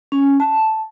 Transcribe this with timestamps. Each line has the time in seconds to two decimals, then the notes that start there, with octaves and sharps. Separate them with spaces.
0.12 C#4
0.40 A5